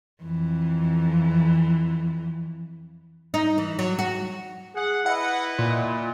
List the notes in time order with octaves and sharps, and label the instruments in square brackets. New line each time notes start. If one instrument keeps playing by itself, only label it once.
[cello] F2 E3
[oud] D#4
E3
F#3
F#4
[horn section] G#4 F#5
[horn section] E4 B4 D#5 [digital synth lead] F#5
[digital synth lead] A#2